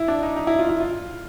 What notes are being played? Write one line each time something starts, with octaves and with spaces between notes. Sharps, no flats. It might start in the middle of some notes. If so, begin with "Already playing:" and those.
Already playing: E4
D4
D#4
D#4
E4
F4
E4
F4